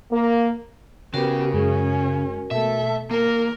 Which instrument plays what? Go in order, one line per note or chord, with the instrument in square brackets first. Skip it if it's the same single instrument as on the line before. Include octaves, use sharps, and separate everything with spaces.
[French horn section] A#3
[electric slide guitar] C#3 [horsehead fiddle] B3 G4 [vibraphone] F#4 A#4
[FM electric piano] F#2 G#3 [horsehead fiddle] C#4
[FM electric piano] B2 [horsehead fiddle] A3 A4 [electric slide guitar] E5
[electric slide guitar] A#3 [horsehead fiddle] A#4